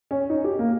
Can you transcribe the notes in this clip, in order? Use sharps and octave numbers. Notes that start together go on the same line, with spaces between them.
C#4
D#4
G4
A#3